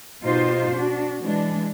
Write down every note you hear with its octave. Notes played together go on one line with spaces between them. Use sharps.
B2 D#4 F4 G4 C5
D4 F#4
E3 G#3 D4